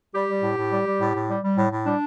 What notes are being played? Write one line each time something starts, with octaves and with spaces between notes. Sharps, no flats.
G3 G4
G3
A2
A2
G3
G3
A2
A2
G3
G3
A2
A2
G3 D4